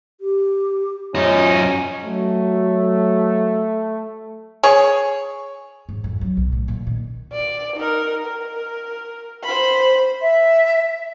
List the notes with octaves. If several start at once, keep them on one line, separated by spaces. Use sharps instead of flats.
G4
F#2 C#4 D#4 F4
F#3 A3
G#4 C#5
G#2
F2
F#3
B1
A2
A#2
D#3
D5
D#4 A#4
A#4
C5 B5
E5